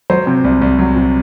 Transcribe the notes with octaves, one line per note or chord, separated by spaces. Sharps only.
F#3 C5
C3
C2
C2
F#3
C3